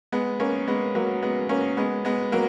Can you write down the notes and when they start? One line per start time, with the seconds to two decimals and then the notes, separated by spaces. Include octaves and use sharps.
0.12 G#3 B3
0.40 A#3 C#4
0.68 G#3 B3
0.95 F#3 A#3
1.23 G#3 B3
1.49 A#3 C#4
1.77 G#3 B3
2.05 G#3 B3
2.32 F#3 A#3